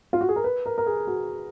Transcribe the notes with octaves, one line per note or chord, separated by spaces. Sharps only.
F4
F#4
G#4
A#4
B4
A#4
A#4
G#4
F#4